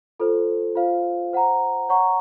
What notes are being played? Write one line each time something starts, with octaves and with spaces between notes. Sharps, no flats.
F4 A4 C5
F4 C5 F5
C5 F#5 A#5
C#5 F#5 A#5 C#6